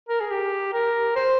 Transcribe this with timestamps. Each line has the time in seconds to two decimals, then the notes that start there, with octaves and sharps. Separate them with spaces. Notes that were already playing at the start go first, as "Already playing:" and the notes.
0.09 A#4
0.20 G#4
0.31 G4
0.73 A#4
1.16 C5